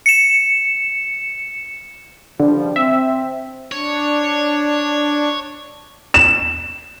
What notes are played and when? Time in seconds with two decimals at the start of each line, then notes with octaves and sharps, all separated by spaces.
0.06 C#7 E7
2.40 C#2 D3 F3 G3
2.76 C4 E5
3.72 D4 C#5
6.14 E7